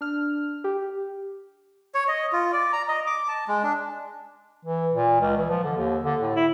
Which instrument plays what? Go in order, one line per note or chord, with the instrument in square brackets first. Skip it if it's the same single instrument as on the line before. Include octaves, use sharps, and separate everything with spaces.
[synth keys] D4 F6
G4
[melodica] C#5
D#5
F4
D5
A#5
D#5
D6
A5
G#3
D4
[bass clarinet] E3
A#2
C#2
E3
F3
D3
D#2
D3
A2
E4